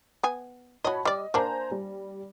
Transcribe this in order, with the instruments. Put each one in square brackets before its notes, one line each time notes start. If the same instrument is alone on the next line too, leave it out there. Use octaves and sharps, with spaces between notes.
[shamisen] B3 G#5
[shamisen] F#4 D#5 [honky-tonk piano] C#5 A5 B5
[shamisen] G3 D5 [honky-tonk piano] D#5
[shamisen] A#3 D4 [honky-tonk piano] C5 G#5 A#5
[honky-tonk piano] G3